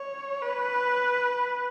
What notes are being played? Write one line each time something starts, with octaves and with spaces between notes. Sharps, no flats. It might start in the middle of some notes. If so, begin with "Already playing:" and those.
Already playing: C#5
B4